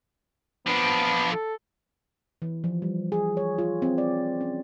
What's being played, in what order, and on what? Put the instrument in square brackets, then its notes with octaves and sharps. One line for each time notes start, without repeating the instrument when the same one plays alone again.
[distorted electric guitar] F3 D4 [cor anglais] B3
[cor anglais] A4
[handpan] E3
F3
G3
G#4
C#5
F4
C4
D5
C#4